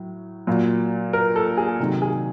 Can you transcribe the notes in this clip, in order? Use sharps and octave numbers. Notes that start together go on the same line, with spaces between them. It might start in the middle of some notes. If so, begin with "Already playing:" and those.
Already playing: A2 F#3
A#2 F#3
A#4
A4
G#4
C3 D#3 F#3
G#4